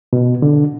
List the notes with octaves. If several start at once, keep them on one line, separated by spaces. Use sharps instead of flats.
B2
D3